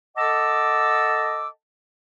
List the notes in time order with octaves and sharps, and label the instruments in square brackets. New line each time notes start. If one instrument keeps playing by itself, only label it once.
[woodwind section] A4 D#5 F#5 A5 D6 E6